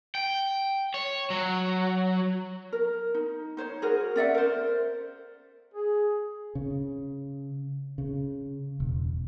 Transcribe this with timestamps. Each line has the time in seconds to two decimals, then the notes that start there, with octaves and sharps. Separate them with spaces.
0.15 G5
0.94 C#5
1.30 F#3
2.72 A#4
3.15 D#4
3.57 D#4 C5 C#5
3.82 F#4 G#4 A#4
4.16 C#4 D5 E5 F#5
4.34 A#4 C5
5.74 G#4
6.55 C#3
7.98 C#3
8.80 E1